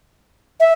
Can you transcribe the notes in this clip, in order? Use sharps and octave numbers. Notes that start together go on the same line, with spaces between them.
E5